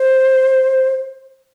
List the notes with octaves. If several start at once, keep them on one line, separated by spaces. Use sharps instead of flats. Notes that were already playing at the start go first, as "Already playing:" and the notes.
Already playing: C5